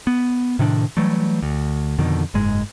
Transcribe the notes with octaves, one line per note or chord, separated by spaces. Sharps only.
B3
A2 C3 D#3 D4
E3 F#3 G3 A3
D2
F2 B2 D3 D#3
F#1 G#2 G#3